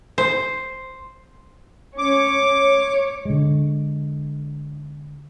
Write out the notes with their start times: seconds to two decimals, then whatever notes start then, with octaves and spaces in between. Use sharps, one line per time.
0.18 C5
1.98 C#4 C#5 D6
2.55 C#5
3.25 D3 G#3